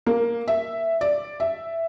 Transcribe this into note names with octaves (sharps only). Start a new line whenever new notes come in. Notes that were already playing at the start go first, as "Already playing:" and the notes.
A#3
E5
D5
E5